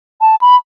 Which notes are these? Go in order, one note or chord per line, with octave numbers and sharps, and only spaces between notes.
A5
B5